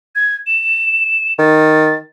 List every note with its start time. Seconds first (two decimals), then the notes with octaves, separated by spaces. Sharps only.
0.16 G#6
0.47 E7
1.39 D#3 A6